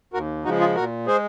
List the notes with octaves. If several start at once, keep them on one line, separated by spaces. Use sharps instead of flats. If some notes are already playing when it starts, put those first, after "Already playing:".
D#2 F#4 A#4
C#3 F3 G#3 D#4 F#4
F4 G#4
A#2 F#4 A#4
G#3 G#4 C5